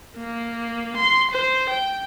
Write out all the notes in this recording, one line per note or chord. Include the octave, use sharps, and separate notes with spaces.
A#3
C6
C5
G5